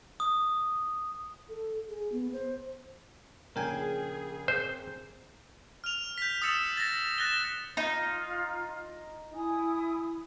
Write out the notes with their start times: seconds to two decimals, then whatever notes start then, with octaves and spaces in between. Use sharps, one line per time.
0.20 D#6
1.49 A4
1.89 G#4
2.12 B3
2.33 C5
3.56 A#1 C#3 G#4 A#4 G5 G#5 G#6
4.48 C4 C5
5.84 F6 F7
6.18 G6 B6
6.42 D#6 E6 A6 C#7 E7
6.77 A6 A#6
7.18 F#6 A6 A#6 E7 G7
7.77 D#4 F4
9.33 E4 G#5 D#6